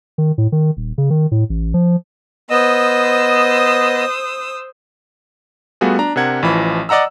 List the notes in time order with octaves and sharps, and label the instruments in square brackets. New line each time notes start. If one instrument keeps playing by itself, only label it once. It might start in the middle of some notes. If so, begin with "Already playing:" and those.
[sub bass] D#3
A2
D#3
D#1
C#3
D#3
A2
A1
F3
[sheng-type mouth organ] B3 D#5 [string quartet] C5 D#6 E6
[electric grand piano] G3 A3 B3 F4 F#4 G#4
D4 A#5
C3 D4 A#4 F#5 G#6
A1 E3 F3 B5
D5 D#5 F#5 A#5 E6